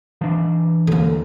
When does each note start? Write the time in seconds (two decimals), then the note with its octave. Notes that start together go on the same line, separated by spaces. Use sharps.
0.21 E3 D4
0.87 D#2 D3 A#3